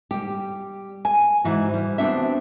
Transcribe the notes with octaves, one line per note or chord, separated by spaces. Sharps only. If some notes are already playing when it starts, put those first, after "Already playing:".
G3 G4
G#5
G#2 E3 F#4
E3 G3
B3 C4 D4 F#4 E5